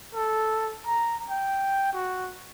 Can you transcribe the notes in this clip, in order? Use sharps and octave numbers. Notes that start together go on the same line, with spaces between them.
A4
A#5
G5
F#4